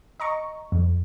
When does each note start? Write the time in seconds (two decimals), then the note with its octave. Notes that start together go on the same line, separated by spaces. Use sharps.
0.20 D#5 A#5 C#6
0.72 F2